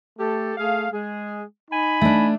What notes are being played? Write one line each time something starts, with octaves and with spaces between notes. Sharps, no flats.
A3 G4 A4
A3 G#4 F5
G#3 G#4
D#4 G#5 B5
A3 D4